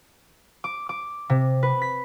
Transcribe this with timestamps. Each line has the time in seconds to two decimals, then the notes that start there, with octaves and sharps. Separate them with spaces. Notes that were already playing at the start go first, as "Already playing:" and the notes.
0.64 D6
0.89 D6
1.30 C3
1.63 B4
1.82 B6